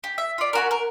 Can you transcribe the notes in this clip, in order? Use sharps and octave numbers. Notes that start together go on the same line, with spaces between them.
G4
E5
F4 D5
C#4 F#4 A#4
A#4